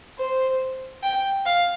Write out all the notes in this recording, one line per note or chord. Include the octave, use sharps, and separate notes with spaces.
C5
G5
F5